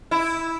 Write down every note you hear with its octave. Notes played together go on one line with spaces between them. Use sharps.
E4